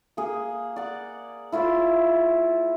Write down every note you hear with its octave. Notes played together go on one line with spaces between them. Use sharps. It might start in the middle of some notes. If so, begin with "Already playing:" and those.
A#3 G#4
D5 F#5
E4 F4 C5 C#5